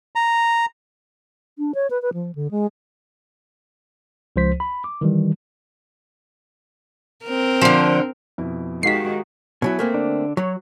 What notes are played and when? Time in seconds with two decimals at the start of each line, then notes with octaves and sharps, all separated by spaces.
0.16 A#5
1.58 D4
1.75 C#5
1.90 B4
2.02 B4
2.14 F3
2.35 D3
2.51 G#3
4.36 C#2 F3 C5 B6
4.60 B5
4.84 D6
5.01 D#3 E3 G3
7.26 C4 A#4
7.61 D3 F3
8.38 F2 B2 E4
8.83 D#3 G#3 F#4 G4 F5 B6 C7
9.62 B2 F#3 E4 G#5
9.79 A3 A#3 C4
9.94 D3 D4
10.37 F#3 C#5